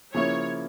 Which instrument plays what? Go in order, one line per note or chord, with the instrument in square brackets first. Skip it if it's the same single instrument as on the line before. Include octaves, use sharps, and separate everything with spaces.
[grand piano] C#3 F3 A#3 E4 [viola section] C#5